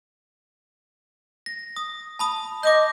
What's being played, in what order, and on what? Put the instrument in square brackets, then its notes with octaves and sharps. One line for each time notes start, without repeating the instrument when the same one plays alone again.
[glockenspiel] A#6
D#6
A5 B5 D#6
[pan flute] D#5 [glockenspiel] D6 D#6 G6